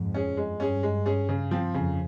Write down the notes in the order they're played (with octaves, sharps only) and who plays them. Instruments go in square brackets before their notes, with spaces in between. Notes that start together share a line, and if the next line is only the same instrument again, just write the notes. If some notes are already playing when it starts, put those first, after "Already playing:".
Already playing: [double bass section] F2 G#2
[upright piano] C#4 G#4
[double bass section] G2 [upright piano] G#3
[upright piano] C#4 G#4
G#3
C#4 G#4
C#3
F3 C4
[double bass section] F2 [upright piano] C#3